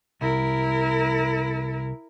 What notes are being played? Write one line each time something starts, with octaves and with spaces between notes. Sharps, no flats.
C2 E4 A#4